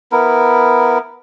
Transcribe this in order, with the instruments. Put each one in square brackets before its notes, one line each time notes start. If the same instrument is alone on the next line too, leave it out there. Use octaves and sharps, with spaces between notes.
[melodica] B3 E4 A#4